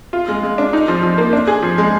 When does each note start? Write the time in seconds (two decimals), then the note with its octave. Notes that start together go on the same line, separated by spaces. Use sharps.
0.13 F4
0.28 G#3
0.43 G#3
0.58 D4
0.73 D#4
0.88 F3
1.03 F3
1.18 A#3
1.33 D4
1.47 G#4
1.62 F3
1.78 G#3